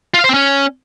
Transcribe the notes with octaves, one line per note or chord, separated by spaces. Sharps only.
F4
F5
C5
C4
C#4